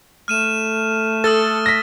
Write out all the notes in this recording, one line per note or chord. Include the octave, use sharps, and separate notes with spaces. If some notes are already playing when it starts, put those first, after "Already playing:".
A3 F6 D#7 E7
A4 D#6 E6 A6
A#6 B6